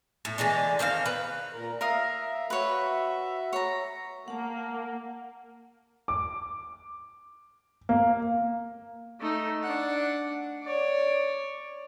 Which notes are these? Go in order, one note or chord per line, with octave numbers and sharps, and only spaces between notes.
A2
D3 E3 G#3 D4
D#3 C4 D5 F5
B4
A#2 A#4
A#4 E5 F5 D#6
F#4 B4 C#5 E5
C#5 A#5
A#3 F#5 A5
D6
A#3
A3 D#4
D4 F#5
C#5 D5